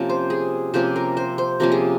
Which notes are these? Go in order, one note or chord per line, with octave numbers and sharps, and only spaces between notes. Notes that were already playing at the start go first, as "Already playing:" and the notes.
Already playing: C3 F3 A#3 C#4
C5
G#4
C3 F3 A#3 C#4 C5
A#4
C5
C5
C3 F3 A#3 C#4 A#4
G#4